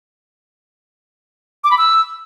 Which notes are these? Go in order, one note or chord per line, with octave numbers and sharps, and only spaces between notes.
D6
B5
E6